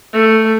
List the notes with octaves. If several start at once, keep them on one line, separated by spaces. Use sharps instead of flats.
A3